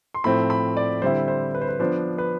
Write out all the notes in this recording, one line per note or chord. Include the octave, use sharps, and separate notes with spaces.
C6
A2 F3 A3 C4 B5
B5
D5
D3 G3 C4 E4 C5
C5
B4
C5
B4
F3 B3 D4 C5
B4